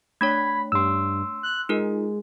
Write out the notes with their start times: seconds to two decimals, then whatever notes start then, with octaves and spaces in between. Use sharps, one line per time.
0.21 A3 D4 C#5 B5 G#6
0.72 G2 C6 E6
1.43 F#6
1.69 G#3 D#4 F4 A#4